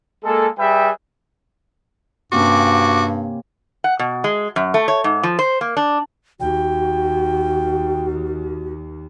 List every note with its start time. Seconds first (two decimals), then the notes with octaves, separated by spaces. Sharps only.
0.24 G#3 A#3 A4
0.59 G3 G#4 B4 E5 G5
2.32 G2 C3 A#3 C#4 F#4 D6
3.84 F#5
3.99 B2
4.24 G#3
4.56 F#2
4.74 A3
4.88 C#5
5.04 G#2
5.23 F3
5.39 C5
5.61 A#3
5.77 D4
6.40 D#2 F#4 G5